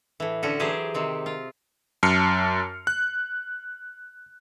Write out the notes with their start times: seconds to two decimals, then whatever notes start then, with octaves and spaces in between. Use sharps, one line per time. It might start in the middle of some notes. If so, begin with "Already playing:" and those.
0.20 A2 E3
0.43 D3 A3 C#4 F#4
0.60 E3 F#3 G4 G#4 C5
0.94 C3 D#3 C4
1.26 F4
2.03 F#2 A5 F6 C7 C#7
2.87 F#6